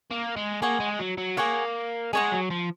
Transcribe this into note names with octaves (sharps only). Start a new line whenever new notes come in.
A#3
G#3
A#3 G#4 C#5 F#5
G#3
F#3
F#3
A#3 G#4 C#5 F#5
G#3 G#4 C#5 F#5
F#3
F3